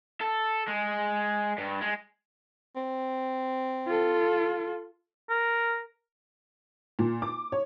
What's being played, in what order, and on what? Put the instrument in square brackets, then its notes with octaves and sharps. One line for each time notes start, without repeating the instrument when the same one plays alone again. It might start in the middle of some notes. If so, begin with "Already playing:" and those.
[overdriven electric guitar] A4
G#3
G2
G#3
[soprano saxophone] C4
[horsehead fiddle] F4 A4
[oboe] A#4
[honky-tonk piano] A#2
D6
C#5